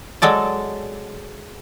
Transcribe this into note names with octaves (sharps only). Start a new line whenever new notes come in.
F#3 G#3 A4 D5